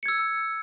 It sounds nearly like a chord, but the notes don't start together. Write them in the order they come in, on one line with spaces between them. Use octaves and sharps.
C#7 G#6 E6